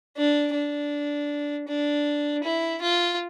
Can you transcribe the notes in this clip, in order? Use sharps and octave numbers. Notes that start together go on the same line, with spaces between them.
D4
D4
D4
E4
F4